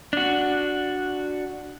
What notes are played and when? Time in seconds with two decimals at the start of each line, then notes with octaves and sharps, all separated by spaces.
0.13 D4 F#4